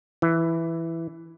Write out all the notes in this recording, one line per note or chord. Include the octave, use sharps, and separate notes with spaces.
E3